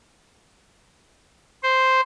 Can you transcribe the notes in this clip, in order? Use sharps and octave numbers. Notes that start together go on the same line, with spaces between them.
C5